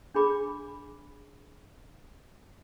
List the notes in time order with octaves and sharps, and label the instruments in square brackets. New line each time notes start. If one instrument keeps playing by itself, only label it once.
[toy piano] D4 G#4 B5 D6